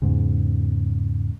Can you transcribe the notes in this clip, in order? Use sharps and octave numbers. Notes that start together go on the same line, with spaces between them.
E2 G#2 C#3